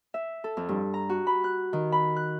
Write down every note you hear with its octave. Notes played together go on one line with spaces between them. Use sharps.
E5
A4
F2
G2
A#5
F#4
B5
F#6
D#3
B5
F#6